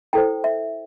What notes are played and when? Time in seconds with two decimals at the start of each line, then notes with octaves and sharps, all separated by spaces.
0.13 E4 A4 C5 G5
0.44 E5